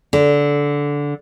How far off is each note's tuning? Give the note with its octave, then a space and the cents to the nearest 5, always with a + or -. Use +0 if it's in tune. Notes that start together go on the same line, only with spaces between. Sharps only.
D3 -15